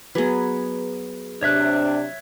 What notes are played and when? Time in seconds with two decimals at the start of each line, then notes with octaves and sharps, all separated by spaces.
0.15 F#3 B3 G#4 B4
1.43 C3 D4 C#5 E5 F#6